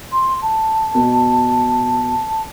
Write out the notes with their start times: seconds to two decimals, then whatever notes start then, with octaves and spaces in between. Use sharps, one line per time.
0.12 C6
0.42 A5
0.95 B2